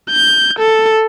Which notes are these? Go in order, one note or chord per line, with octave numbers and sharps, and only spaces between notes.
G6
A4